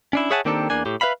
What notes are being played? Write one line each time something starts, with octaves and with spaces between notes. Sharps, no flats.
C#4 D4 E4
G#4 C#5 E5 F#5 G#5 A5
D#3 A#3 C4 D4 G4 A4
E2 A#3 D4 G#5
A2 G4
B4 C5 E5 F5 B5